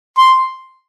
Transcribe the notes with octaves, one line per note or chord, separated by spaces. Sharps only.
C6